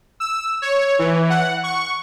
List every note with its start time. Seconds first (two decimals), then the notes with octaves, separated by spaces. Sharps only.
0.20 E6
0.62 C#5
0.99 E3
1.30 F#5
1.63 C#6